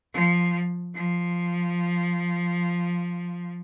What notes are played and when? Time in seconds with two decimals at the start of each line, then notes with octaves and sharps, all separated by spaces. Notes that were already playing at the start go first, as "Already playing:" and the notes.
0.13 F3
0.94 F3